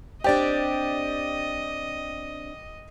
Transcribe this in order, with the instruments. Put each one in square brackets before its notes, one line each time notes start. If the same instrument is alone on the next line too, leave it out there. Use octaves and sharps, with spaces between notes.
[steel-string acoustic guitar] C4 D4 [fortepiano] G4 D5 [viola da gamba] D#5